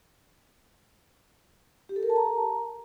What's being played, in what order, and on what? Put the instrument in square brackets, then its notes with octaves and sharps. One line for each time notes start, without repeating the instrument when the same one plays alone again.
[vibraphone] G4
A4
A#4
A5
A#5